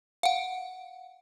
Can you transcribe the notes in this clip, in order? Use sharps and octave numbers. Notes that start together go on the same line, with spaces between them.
F5 F#5